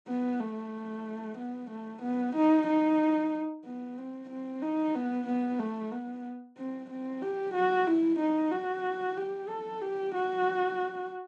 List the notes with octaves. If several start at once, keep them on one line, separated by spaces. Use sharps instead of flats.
B3
A3
B3
A3
B3
D#4
D#4
B3
C4
C4
D#4
B3
B3
A3
B3
C4
C4
G4
F#4
E4
D#4
F#4
G4
A4
G4
F#4